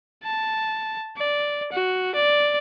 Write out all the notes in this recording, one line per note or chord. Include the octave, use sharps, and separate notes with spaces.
A5
D5
F#4
D5